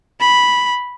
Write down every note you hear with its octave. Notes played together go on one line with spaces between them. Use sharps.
B5